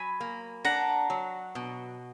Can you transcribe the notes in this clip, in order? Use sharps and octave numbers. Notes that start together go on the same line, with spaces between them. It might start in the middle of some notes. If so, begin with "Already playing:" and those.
Already playing: F#3 G#5 B5
A#3
D4 F#5 A#5
F#3
B2